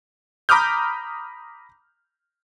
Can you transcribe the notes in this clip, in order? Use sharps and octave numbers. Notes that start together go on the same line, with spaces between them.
A#5 B5 D6 D#6 F6 G6